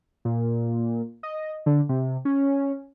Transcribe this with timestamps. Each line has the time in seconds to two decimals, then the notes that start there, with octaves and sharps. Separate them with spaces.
0.25 A#2
1.23 D#5
1.66 D3
1.89 C3
2.25 C#4